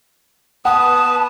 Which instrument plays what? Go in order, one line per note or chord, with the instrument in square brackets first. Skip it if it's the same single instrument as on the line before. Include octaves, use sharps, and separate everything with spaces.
[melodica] B3 B4 [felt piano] F#5 [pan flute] A5 [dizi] D#6